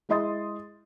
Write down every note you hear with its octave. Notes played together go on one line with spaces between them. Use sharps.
G#3 E4 D#5 C6 D#6 A6